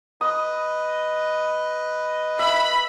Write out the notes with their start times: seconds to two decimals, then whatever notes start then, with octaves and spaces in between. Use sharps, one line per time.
0.21 B4 D#5 D#6
2.39 E5 B5